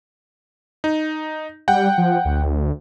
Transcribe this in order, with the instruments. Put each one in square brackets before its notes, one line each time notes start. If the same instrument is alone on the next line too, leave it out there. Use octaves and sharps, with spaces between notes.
[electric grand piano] D#4
[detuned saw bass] G3 [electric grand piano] F#5 G5
[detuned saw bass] F3
D2